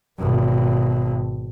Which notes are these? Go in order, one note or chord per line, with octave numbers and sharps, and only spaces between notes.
G#1 B2